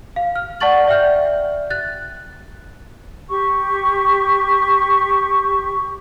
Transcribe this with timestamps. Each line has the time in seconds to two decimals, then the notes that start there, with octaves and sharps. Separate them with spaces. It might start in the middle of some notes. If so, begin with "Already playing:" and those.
0.16 F5
0.35 F6
0.60 D5 F#5 A5 C#6 A6 F#7
0.87 D5 E5 G5 F6 G6
1.70 F#6 A6
3.30 G4 C#6